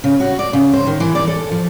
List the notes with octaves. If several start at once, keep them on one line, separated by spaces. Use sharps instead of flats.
C#3
F#4
D5
C#3
C5
D#3
E3
D5
A4
F3